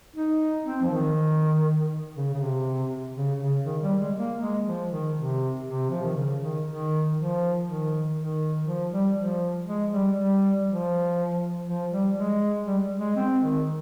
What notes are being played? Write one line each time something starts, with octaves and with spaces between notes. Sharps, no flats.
D#4
C4
F3
D#3
C#3
C#3
C3
C#3
C#3
D#3
G3
G#3
A#3
G#3
F3
D#3
C3
C3
F3
D#3
C#3
D#3
D#3
F3
D#3
D#3
F3
G3
F3
G#3
G3
G3
F3
F3
G3
G#3
G3
G#3
C4
D#3